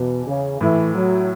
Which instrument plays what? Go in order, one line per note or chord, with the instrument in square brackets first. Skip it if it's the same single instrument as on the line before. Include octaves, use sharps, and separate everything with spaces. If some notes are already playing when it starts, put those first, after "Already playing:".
Already playing: [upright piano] E2 E3 [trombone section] B2
[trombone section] C#3
[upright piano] A2 A3 E4 [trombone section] E3
[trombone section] F#3